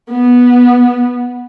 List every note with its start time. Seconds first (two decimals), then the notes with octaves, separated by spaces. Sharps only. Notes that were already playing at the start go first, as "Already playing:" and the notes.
0.10 B3